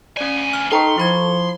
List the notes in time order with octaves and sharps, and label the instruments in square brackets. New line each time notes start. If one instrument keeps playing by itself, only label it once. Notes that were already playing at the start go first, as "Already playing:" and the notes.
[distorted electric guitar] D2 G#5 [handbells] C#4 D5
[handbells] F6
[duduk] D#4 [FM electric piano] A4 C#6 [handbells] B4 G5 A#5 [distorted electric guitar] C6
[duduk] F3 [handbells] E4 B5 G#6